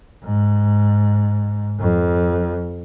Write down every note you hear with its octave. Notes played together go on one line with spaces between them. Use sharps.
G#2
F2